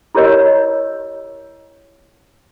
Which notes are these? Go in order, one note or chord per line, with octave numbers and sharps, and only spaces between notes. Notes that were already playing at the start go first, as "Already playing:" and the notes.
E4 G4 A#4 C#5 D#5 E6